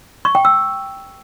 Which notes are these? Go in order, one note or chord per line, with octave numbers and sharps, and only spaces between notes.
C#6
G5
E6